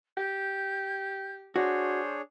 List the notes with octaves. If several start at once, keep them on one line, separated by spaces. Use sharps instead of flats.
G4 G6
D4 F#4 G#4 C5 C#5